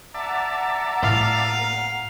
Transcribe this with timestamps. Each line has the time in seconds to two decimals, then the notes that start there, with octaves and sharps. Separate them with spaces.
0.14 D5 E5 F#5 A5 A#5
1.03 A2 E4 F5